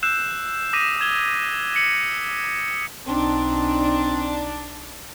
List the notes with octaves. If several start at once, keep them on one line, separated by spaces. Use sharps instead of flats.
E6 F#6 G6 C7 E7
D6 D#6 A#6 B6 D#7
D#6 G#6 F7 G7
B6 C#7 F#7
B1 C4 D4 D#4